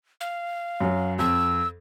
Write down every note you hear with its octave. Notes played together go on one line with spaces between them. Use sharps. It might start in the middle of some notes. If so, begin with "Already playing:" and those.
F5
F#2 F#3
F2 E6